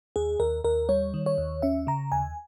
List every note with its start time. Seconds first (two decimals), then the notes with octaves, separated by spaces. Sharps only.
0.16 D#2 G#4
0.40 D#2 A#4
0.64 D#2 A#4
0.89 G3 C#5
1.14 D#3
1.26 C#5
1.38 D#2
1.62 C#4 E5
1.87 C#3 A#5
2.12 D#2 G#5